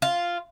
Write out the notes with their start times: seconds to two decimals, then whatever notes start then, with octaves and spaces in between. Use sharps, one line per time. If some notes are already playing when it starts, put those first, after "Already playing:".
0.02 F4